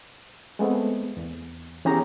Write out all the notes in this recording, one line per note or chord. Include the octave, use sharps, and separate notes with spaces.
G#3 A3 B3 C4
E2
E3 B3 C#4 G4 G#4 A#5